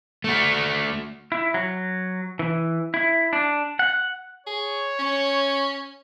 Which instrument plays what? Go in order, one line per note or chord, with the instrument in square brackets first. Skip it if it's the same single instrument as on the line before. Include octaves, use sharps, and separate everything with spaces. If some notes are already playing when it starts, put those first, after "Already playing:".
[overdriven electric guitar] A3 F#4
[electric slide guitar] E4
F#3
E3
E4
D4
F#5
[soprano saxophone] G#4 [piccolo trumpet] C#5
[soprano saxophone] C#4